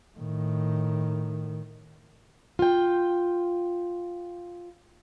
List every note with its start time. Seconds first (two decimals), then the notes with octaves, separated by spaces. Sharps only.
0.18 A2 D#3
2.59 F4 G5